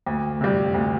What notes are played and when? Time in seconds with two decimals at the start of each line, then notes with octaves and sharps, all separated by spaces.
0.06 D2
0.41 C3 G3
0.74 D2